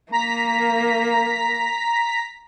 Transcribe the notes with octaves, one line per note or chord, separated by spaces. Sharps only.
A#3 A#5 B6